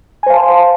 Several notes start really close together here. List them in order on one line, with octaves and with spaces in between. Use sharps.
G#5 C5 F5 A5 C6